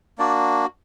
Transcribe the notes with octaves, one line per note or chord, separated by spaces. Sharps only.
A#3 D4 F#4 D5